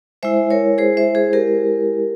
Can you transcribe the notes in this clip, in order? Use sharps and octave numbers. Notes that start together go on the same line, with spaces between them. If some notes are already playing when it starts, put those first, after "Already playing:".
G#3 E4 C5 E5
A#4 C#5
G#4 C5
C5 E5
G#4 C5
G4 A#4